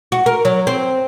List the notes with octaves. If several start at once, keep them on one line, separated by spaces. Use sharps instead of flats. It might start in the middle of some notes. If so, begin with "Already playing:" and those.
F#4
A#4
F#3
C4